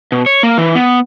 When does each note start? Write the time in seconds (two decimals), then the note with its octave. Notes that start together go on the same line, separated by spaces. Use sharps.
0.12 B2
0.26 C#5
0.43 A#3
0.58 E3
0.75 B3